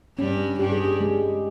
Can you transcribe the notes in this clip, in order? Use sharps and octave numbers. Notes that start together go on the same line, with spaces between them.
G2 G3 C#4
G2 G3 G4
G#4
G4
G#3